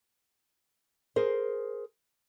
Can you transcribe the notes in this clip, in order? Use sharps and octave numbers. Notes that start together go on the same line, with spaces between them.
G#4 A#4 C5